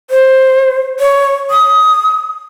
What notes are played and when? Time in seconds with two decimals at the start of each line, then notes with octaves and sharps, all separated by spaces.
0.10 C5
1.00 C#5
1.51 D#6